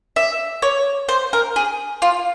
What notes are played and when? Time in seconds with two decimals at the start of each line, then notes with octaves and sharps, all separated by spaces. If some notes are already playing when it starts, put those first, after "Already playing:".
0.16 E5
0.62 C#5
1.09 C5
1.33 A#4
1.56 G#4
2.02 F4